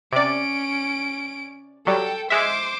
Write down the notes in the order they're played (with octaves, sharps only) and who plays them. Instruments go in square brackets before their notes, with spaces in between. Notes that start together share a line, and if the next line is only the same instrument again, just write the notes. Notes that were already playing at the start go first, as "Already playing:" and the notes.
[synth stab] C3 D5 [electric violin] C#4 D7
[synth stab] F#3 G3 [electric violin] A4 G5
[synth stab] G#3 E5 [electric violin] C5 D6